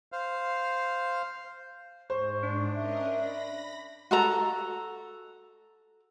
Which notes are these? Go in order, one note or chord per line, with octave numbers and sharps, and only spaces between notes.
C5 F5
G#2 C5 C#6
D4
C#4 A#4 D#5 E5
B5 A#6
F#4 A4 A#5